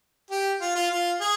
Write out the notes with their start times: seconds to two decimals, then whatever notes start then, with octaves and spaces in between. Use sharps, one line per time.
0.31 G4
0.61 F4
0.76 F4
0.91 F4
1.21 G#4